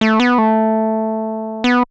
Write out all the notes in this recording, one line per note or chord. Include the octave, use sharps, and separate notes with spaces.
A3
B3
A3
B3